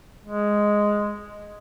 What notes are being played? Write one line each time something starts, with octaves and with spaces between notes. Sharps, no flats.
G#3